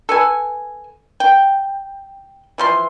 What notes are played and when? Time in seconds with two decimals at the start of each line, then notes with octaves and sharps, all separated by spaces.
0.09 A4 B4 G#5
1.20 G5
2.58 E3 F3 C6